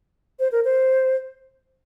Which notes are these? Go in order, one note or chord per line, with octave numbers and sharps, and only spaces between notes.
C5
A#4
C5